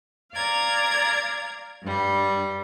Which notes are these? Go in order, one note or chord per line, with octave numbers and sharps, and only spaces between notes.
D5 F5 A#5 G#6
G2 G3